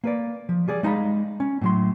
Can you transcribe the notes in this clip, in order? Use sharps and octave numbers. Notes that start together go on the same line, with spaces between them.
A#3 B4 D5
F3
G3 G#4 D5
G#3 D#4 F5 A#5 B5
C#4
A2 F#3 C6